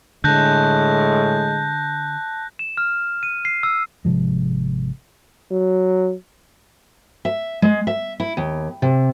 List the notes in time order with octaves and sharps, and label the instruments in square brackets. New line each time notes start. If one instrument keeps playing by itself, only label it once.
[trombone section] A2 G#3 [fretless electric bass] D3 [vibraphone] A5 [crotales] F#6 G6 A#6
[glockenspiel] E7
F6
D#7
C7
E6
[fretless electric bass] G#1 C3 F3 G#3
[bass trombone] F#3
[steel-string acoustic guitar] E5
G#3
E5
E4
D#2
C3